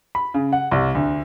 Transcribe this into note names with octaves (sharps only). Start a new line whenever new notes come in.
B5
C#3
F#5
C2
D2